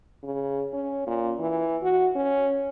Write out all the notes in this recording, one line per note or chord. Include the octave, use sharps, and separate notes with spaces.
C#3
C#4
A#2
E3
F#4
C#4